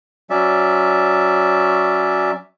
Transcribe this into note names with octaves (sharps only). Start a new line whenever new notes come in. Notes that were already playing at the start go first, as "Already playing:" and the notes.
F#3 C#4 D5 E5